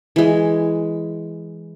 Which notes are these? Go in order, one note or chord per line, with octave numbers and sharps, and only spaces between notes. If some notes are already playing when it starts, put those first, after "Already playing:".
E3 G#3